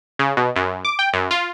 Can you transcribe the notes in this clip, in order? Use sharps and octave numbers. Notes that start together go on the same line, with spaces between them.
C#3
B2
F#2
D6
G5
F#2
F4